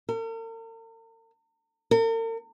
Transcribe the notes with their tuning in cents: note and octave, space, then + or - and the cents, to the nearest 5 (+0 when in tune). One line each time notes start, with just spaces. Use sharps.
A#4 -45
A#4 -45